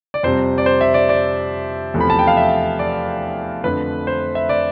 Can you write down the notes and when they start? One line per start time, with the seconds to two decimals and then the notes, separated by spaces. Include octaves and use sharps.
0.14 D5
0.23 F2 C3 G3 C5
0.58 D5
0.66 C5
0.81 E5
0.94 D5
1.09 D5
1.94 E2 C3 F3 A3
2.01 B5
2.10 A5
2.19 G5
2.27 F5
2.37 E5
2.79 D5
3.64 F2 D3 A3 B4
4.07 C5
4.35 E5
4.49 D5